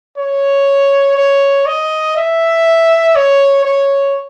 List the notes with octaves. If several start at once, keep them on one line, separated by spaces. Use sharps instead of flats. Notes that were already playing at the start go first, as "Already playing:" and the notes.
C#5
C#5
D#5
E5
C#5
C#5